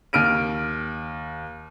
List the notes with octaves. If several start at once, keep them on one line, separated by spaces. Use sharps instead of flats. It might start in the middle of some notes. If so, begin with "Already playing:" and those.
D#2 F6 D7 D#7